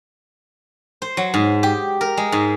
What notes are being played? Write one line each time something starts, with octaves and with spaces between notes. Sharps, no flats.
C5
F#3
G#2
G4
A#4
G#3
G#2